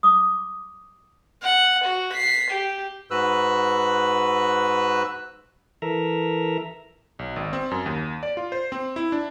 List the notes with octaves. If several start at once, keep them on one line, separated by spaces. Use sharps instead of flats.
D6 D#6
F#5
F#4
B6 C7
G4
G#2 F#4 B4 E6 F#6
E3 A4 A#4 E5 A#5
B1
G#1
C4
F#2
D#2
D5
F4
C5
C4
E4
D4